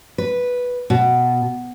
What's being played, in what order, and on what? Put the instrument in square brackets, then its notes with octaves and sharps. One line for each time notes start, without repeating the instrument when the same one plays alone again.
[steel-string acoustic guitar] B4
B2